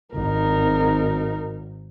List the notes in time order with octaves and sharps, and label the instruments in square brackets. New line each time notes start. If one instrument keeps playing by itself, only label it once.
[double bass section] G#1 [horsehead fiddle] D#4 A#4